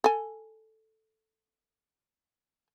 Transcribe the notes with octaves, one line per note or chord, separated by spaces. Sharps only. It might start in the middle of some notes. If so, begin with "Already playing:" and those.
A4 G#5